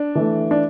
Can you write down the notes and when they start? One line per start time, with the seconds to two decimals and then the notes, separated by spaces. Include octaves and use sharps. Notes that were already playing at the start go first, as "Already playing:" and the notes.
Already playing: D4
0.15 E3 A3
0.51 D4